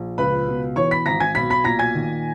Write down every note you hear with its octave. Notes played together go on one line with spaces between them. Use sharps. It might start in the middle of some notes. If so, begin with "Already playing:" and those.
Already playing: A#1
C#2 B4 B5
B2
E3 C#5 C#6
B5 B6
G#1 A#5 A#6
G#5 G#6
B1 B5 B6
B5 B6
A#2 A#5 A#6
G#5 G#6
D#3